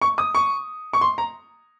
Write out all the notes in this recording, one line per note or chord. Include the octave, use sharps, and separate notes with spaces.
C#6
D#6
C#6
C#6
C6
A#5